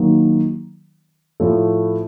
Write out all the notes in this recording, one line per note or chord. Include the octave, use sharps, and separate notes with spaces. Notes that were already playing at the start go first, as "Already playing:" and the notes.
Already playing: D#3 F#3 A#3
A2 F3 A3